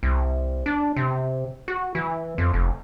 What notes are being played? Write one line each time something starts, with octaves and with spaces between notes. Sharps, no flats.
C2
D4
C3
F#4
E3
F2
F1